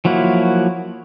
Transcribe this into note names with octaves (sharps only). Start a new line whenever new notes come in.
F3 F#3 A#3 E4 F#4